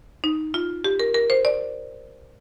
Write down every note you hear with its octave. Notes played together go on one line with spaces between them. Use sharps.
D#4
F4
G4
A#4
A#4
C5
D5